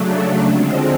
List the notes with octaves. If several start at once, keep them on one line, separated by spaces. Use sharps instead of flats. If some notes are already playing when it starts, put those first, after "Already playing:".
Already playing: C#3 F#3 A3 D4
D3 F3 G#3 C4